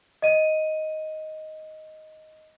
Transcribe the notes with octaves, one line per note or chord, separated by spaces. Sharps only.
D#5 D#7